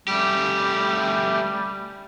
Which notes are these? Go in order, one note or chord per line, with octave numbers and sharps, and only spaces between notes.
G3 A3 G4